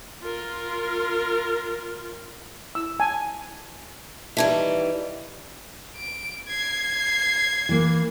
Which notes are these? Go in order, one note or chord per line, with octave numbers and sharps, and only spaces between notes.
F4 A#4
E4 E6
G#5 A5
D#3 E3 G3 E5 A5 G#6
D7
G#6 C7
E3 A#3